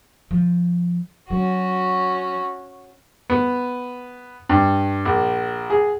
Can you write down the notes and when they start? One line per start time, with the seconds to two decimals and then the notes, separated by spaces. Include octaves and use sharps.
0.31 F3
1.30 F#3 C#4 F#4
3.30 B3
4.49 G2
5.05 A#1
5.70 G#4